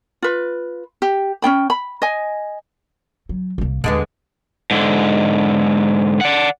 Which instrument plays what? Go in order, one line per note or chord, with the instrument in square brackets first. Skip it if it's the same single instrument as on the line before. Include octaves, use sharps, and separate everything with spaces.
[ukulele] F4 B4
G4
C#4 D4 G5 B5
B5
D#5 G#5
[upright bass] F#3
C2 A#3
[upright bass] D#2 [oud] D3 G#3 B3
[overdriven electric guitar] G#2 D3
D5 F#5